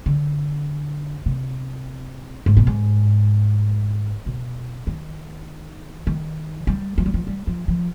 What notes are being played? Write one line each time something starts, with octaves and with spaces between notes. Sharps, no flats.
D3
C3
G#2
B2
G#2
B2
D#3
D#3
G3
F3
G3
F3
G3
F3
F3